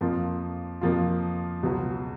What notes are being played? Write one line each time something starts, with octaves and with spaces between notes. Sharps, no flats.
F2 F3 A#3 F4
F2 F3 A#3 F4
C#2 B2 F#3 B3